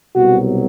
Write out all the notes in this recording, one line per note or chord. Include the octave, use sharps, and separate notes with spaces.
C2 B2 F#3 F#4